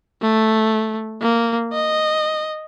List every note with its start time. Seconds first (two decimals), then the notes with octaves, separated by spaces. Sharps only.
0.22 A3
1.22 A#3
1.73 D#5